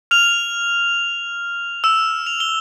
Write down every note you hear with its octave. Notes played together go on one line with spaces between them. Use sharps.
F6 F7
E6 E7
F7
G7